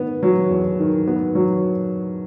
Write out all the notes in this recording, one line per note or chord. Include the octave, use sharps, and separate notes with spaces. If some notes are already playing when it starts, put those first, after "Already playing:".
Already playing: D#3 B3
F#3
E2
D#3
B3
F#3